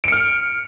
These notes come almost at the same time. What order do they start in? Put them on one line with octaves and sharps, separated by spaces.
D7 C#7 F6